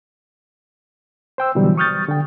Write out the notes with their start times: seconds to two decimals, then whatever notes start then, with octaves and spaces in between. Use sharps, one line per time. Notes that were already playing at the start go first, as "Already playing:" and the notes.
1.38 C5 G5 E6
1.55 B2 D3 E3 F#3 G3
1.78 C#6 D#6 F6 G6 A6
2.09 D3 G5